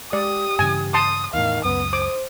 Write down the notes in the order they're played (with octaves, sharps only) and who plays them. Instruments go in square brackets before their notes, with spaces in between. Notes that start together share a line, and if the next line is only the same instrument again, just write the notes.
[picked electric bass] G#3 [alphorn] G4 [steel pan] D5 [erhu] D#6
[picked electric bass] G2 C#3 E3 [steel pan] G#5
[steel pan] A5 C6 [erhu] D#6
[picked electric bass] E2 A2 [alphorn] D#3 [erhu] F5
[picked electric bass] C#2 F#2 [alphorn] B3 [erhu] D#6
[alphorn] C5 [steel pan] D6